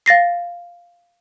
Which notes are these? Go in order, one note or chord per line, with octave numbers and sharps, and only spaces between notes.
F5 A6 A#6 C7